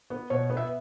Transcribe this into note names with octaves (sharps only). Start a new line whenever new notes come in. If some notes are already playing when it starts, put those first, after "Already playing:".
B3
B2 C#5
B3
E5